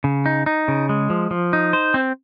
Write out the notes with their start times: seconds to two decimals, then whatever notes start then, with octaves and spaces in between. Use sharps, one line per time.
0.04 C#3
0.26 D#4
0.46 D#4
0.68 C#3
0.89 G#3
1.10 F3
1.31 F3
1.53 D#4
1.73 C5
1.94 C4